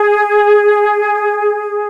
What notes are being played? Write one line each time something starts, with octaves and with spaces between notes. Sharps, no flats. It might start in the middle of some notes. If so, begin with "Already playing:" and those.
Already playing: G#4